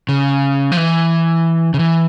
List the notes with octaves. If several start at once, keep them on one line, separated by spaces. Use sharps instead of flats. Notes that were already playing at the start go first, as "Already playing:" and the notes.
C#3
F3
E3
C#3
E3